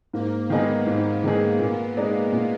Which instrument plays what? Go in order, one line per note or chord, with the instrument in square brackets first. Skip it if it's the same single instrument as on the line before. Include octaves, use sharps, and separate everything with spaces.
[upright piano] G#2 [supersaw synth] A#3
[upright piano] D#3 G#3 D#4 G#4 [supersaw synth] B3
[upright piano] G#2
D#3 G#3 D#4 G#4
A#2
G#3 D#4 G#4 D5
A#2